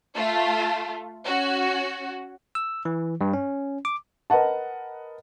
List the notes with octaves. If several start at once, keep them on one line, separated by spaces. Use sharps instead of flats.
A3 F4
C#4 F#4
E6
E3
G2
C#4
D6
A#4 B4 D#5 F#5 A5